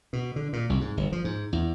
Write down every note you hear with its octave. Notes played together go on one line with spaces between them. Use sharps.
B2
D3
A#2
C2
G#2
G1
F3
G#2
E2